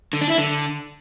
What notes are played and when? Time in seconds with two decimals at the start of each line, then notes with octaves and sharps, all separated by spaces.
0.13 D3
0.21 D4
0.30 E4
0.38 D3